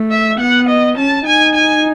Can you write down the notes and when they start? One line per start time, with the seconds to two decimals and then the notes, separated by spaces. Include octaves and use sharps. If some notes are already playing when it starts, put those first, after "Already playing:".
Already playing: A3
0.11 E5
0.40 B3 F#5
0.69 D#5
0.97 C#4 A5
1.26 D#4 G#5
1.55 G#5